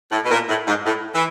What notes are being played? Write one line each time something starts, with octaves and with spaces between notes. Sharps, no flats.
A2
B2
A#2
A2
G#2
A2
E3